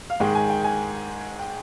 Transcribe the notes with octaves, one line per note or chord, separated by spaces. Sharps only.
F5
G#2 D#3 G#3 G5
G#5
G5
G#5
G5